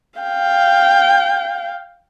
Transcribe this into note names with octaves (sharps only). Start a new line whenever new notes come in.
F5 G5